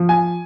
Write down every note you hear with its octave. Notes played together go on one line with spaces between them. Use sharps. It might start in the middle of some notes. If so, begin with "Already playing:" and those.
Already playing: F3
G#5